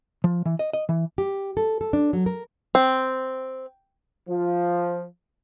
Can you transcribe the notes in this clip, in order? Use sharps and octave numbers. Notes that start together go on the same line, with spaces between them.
F3
E3
D#5
D#5
E3
G4
A4
A4
D4
F#3
A#4
C4
F3